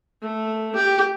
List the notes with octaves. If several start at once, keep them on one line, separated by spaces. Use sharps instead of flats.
A3
G4